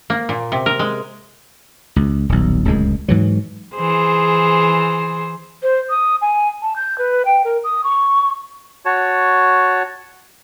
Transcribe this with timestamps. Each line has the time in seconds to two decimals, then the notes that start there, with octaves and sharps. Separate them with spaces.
0.10 A#3
0.29 A#2
0.52 C3
0.66 A#4
0.79 G#3
1.96 C#2
2.29 D#1 B1
2.65 D1 C#2 F#2 G#3
3.08 G#2 E3 F#3
3.75 E3 G#4 C5
5.62 C5
5.90 D#6
6.22 G#5
6.62 A5
6.76 G6
6.98 B4
7.25 G5
7.44 A#4
7.64 D#6
7.84 C#6
8.85 F#4 C#5 A5